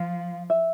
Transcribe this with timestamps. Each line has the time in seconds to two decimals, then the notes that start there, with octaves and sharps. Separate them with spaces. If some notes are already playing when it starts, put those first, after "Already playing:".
Already playing: F3 F5
0.50 E5